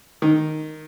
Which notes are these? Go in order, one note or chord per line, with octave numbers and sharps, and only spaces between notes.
D#3